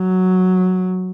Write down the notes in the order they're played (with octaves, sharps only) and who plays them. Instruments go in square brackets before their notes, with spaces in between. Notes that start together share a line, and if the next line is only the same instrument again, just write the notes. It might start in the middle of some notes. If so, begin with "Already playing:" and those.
Already playing: [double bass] F#3